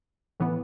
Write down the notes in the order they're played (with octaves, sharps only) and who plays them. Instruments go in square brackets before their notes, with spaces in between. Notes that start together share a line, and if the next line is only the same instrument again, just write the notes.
[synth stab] A2 E3 B3